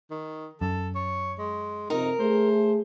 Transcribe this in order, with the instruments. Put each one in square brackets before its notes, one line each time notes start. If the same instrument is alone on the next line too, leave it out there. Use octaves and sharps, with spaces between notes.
[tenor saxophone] D#3
[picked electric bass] F#2 [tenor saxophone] A4
[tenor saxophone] C#5
G#3
[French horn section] F2 C3 [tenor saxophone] D#4 [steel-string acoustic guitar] A#4
[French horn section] A3 G#4 [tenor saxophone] C5